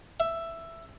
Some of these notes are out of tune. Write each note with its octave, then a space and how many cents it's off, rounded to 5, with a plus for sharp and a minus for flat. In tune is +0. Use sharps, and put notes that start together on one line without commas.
E5 +10